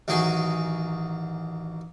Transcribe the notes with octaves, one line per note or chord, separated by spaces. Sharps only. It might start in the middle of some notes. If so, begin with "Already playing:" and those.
A1 D#3 F#3 G#4 G#5